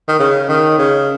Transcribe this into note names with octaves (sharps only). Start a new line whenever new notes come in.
D#3
C#3
D#3
C#3